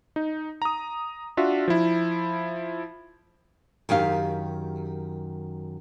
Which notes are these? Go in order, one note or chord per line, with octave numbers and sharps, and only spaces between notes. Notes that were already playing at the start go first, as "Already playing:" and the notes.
D#4
A#5 D#6
D4 F4 F#4 E5
F3 E4
F#2 D#3 G4 F5